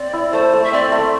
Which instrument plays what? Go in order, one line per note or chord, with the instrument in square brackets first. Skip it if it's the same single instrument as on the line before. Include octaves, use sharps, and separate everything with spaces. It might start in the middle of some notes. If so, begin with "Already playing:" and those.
Already playing: [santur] C4 [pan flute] D5
[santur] E4
[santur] A3 [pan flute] C5
[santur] A3
[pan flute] E5
[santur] C4 [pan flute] D5
[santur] A3